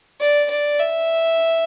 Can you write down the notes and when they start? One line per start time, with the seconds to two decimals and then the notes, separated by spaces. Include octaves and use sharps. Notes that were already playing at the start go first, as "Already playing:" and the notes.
0.20 D5
0.50 D5
0.79 E5